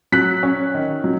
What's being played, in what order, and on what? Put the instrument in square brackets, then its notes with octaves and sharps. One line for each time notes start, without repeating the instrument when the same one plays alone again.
[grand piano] F#3 F#6 B6
C#4
D#3
F#3